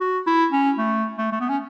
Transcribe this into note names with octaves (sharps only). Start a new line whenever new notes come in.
F#4
E4
C#4
A3
A3
A3
B3
C#4